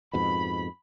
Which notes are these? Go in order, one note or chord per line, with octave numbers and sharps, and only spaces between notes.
F2 G#2 B2 B5